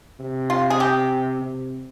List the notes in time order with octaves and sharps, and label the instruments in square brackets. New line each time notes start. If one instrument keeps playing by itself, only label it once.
[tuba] C3
[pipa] F4
G#4
G4
[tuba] C3